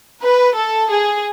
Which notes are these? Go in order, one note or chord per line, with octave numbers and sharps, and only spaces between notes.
B4
A4
G#4